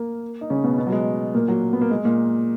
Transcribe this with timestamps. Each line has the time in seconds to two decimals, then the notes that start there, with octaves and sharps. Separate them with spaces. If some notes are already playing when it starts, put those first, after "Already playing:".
Already playing: A#3 A#4
0.41 D#4
0.50 C#3 C#4
0.64 B2 B3
0.78 B2 B3
0.87 F#3
0.92 G#3
1.35 A#2 A#3
1.48 F#3
1.73 B3
1.81 A#3
1.91 G#3
2.05 A#2 A#3